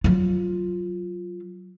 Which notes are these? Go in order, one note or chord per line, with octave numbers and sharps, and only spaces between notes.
F#3 F4